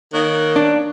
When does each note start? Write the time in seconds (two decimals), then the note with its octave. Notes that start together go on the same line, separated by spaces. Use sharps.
0.13 D#3 A#3 C#5 F#6
0.56 D4